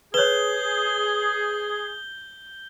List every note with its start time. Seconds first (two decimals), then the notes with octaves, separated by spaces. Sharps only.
0.14 G#4 B4 C#5 G6 G7